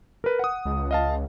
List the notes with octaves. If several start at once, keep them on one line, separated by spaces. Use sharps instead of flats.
A#4 B4
F#5 D#6
C#2
D#5 F5 A5